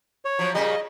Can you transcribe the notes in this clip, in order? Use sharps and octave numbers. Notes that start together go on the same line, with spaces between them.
C#5
F3 F#3
A#2 C#3 G3 D#5